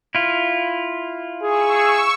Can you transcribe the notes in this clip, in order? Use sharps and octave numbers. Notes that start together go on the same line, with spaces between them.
E4 F4
G#4 C#6 E6